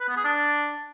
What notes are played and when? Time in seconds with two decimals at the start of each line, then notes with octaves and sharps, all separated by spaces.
0.01 B4
0.09 B3
0.17 G#4
0.24 D4